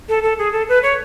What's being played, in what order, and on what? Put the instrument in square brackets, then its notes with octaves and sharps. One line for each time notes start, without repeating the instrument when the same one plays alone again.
[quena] A4
A4
G#4
A4
B4
C#5